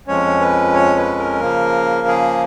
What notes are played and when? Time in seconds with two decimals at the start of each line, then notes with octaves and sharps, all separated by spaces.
0.07 F2 F3 G#3 C#4 C#5
0.40 B4
0.74 C#5
0.97 B4
1.18 A#4
1.40 C#3 F3 A#3
2.08 G#4